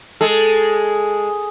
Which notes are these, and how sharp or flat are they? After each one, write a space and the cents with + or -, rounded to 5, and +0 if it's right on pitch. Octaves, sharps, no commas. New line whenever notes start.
G#3 +0 A4 +0